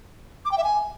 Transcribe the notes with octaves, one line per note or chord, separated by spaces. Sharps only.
D6
G5
E5
G#5